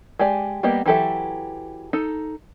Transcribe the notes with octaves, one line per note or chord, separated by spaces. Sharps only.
G#3 G4 D5 G#5
G3 A#3 B3 G4 D#5
E3 F#3 G4 A4 E5
D#4 A4